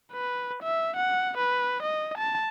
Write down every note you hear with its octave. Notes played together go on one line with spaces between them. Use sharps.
B4
E5
F#5
B4
D#5
A5